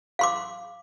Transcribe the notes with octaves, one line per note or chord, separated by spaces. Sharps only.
F5 C6 D6